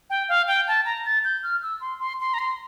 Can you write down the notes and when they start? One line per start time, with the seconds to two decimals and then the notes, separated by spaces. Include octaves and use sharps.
0.10 G5
0.29 F5
0.48 G5
0.68 A5
0.85 A#5
1.06 A6
1.24 G6
1.43 F6
1.63 E6
1.81 C6
2.00 C6
2.20 C6
2.34 A#5
2.39 C6